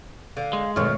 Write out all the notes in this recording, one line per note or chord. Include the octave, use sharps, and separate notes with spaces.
D3 F5
G#3
G#1 B2 F#3 A3 C#5 C#6 F6